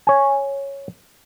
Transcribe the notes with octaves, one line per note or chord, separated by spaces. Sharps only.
C#5 G#5